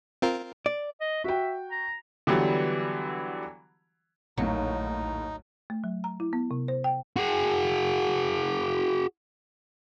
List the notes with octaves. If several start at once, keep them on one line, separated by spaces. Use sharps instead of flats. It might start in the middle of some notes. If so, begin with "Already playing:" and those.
C4 F4 A#4
D5
D#5
F#4 E5 G5
A#5
D3 E3 F#3 G3 B3
A#1 D#2 A2 F#3 D#4 A#5
A3
F#3
A#5
E4
B3
C3
C5
G5
F#4 G#4